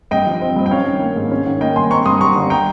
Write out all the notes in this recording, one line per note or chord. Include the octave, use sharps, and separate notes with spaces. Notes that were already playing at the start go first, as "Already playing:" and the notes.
G2 D#5 G5
F3
C4
G2
G5
C#4 C#5 F5
D#3
A#3
G#2
C#4
D#3
A#3 D#5 G5
G2 G#5 C6
C4 A#5 C#6
G2 C6 D#6
G3 A#5 C#6
G1
G5 A#5